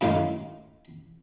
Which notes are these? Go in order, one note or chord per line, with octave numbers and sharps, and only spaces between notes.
F#2 A2 D#3 F5 C6